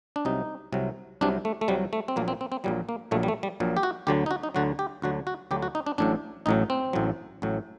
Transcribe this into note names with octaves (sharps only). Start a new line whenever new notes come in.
D4
C2 C3 F#3 D#4
C2 C3 F#3
C2 C3 F#3 D4
A3
A3
C2 C3 F#3 G3
A3
C4
A#1 A#2 F#3 A#3
C4
C4
C4
A#1 A#2 F#3 G3
A#3
A#1 A#2 F#3 A3
G3
A3
G3
A#1 A#2 F#3
G4
F#4
D2 D3 F#3 G4
D#4
F#4
D#4
D2 D3 F#3 F#4
G4
D2 D3 F#3 F#4
F#4
D2 D3 F#3 G4
F#4
D#4
D4
A1 A2 F#3 D4
A1 A2 F#3 D#4
C4
A1 A2 F#3
A1 A2 F#3